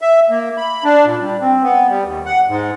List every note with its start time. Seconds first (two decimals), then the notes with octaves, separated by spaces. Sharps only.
0.02 E5
0.30 A#3
0.58 B5
0.84 D4
1.05 A#2
1.21 G3
1.41 C4
1.63 B3
1.89 G3
2.05 D#2
2.26 F#5
2.48 G#2